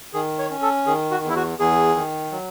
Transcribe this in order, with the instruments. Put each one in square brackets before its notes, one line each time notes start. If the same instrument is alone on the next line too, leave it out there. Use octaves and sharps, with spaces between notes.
[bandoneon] D#3 G#4
C#5
C#4
A4
D#3 G#4
F#4
E2
E4
F#4
E2 G#4
D#3
F#3